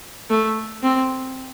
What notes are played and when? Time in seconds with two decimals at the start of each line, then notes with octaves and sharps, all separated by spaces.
0.30 A3
0.82 C4